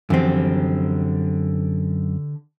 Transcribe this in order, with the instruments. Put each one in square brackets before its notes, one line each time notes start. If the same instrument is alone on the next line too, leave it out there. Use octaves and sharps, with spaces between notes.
[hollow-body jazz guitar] F#2 C4 [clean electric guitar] D3 G4 [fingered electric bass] E3 F3